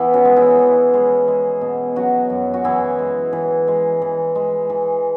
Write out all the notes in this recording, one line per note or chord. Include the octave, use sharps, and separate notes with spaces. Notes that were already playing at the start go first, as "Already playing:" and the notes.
Already playing: E3 B3 E4
C#4 F#4
G#3
E4 G#4
E3
G#3
G#3
B2
F#3 C#4 F#4
F#2
F#4
E3 E4 G#4
G#3
E3
G#3
E3
G#3
E3